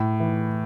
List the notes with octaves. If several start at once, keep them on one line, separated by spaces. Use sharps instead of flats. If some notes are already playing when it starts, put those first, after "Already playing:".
Already playing: A2
E3